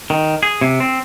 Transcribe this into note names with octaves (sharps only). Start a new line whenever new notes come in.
D#3
G#4
C3
C4